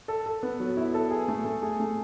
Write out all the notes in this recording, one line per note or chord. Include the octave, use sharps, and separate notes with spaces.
A4
A4
B3
F#3
E4
A4
G#4
A3
A3
G#4
A3